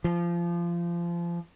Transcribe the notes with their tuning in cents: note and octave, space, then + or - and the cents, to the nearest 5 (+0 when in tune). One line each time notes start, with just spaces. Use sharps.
F3 -25